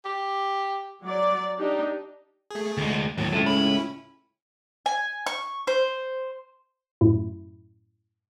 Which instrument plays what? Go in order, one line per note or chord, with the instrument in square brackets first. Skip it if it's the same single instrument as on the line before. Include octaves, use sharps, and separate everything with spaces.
[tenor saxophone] G4
[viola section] F#3 D5
D4 D#4 G4
[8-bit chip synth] A3 G#4
[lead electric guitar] D2 G#3
[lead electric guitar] D#2 A2 [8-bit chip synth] F#3
[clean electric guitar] C#2 A2 [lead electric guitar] C4 A4
[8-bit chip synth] C#4 E4 [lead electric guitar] B5
[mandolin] G#5
C#6
C5
[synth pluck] F#2 A2 E4